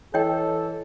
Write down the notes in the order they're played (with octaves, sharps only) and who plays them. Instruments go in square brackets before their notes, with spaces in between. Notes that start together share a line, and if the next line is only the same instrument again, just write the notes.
[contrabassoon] E3 [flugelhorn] A4 [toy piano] C#5 D#5 G5